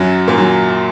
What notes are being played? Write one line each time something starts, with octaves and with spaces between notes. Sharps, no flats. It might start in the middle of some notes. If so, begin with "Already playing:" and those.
Already playing: F#2 F#3
A#2 A#3
F#3